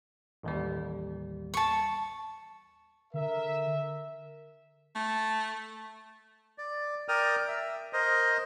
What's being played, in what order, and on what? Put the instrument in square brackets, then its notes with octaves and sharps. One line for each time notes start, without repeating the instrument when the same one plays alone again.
[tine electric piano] A1 D#2 G3
[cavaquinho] A5 C#6
[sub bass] D3 [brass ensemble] A#4 E5
[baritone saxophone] A3
[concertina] D5
A#4 D5 G5 D#6 F6
E5
A#4 C5 D#5